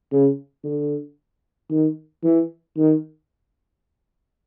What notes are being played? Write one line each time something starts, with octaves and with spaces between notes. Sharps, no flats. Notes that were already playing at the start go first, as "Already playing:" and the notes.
C#3
D3
D#3
E3
D#3